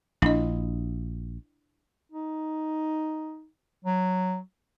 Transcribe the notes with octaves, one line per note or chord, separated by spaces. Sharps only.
A#1 D4 E4 D#5
D#4
F#3